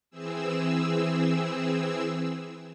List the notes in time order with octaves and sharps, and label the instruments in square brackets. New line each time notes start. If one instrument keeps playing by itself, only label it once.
[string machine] E3 C4 G#4 E6